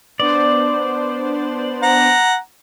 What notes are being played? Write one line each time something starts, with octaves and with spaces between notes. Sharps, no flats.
B3 D4 C5 D5
F#5 A#5